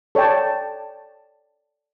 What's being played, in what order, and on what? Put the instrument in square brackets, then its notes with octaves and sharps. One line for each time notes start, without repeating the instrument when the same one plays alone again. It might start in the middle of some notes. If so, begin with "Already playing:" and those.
[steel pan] A4 C#5 D5 G5 A5